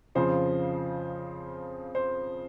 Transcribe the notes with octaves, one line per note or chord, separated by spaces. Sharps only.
F2 C#3 F3 C5
C5